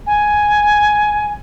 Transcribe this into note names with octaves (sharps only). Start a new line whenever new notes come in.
G#5